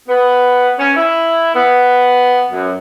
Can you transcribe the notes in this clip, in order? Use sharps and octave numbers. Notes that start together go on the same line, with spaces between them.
B3
C#4
E4
B3
F#2